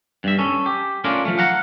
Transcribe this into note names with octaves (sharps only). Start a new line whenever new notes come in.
G2 E5
C#4 A4
G4
A3 C#4 D4 F4 A#4
F3 A3
F5 F#5 A#5